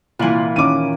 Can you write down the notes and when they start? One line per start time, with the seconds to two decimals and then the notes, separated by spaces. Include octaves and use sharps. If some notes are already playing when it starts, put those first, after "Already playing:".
0.19 C2 A#2 E3 E4 F4 F#7
0.56 D#3 C#4 D6 D#7